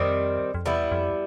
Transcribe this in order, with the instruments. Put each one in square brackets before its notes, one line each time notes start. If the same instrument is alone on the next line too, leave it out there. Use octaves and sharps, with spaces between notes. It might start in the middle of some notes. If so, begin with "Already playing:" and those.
Already playing: [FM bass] F2 [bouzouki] D#3 G3 C4
[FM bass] F2
[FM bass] E2 [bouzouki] G3 B3 E4
[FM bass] F2